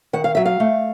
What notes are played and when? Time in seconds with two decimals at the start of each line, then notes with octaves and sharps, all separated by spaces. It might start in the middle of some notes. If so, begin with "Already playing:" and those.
0.13 D#3 F#5
0.24 F5
0.35 F#3 E5
0.46 F5
0.60 A3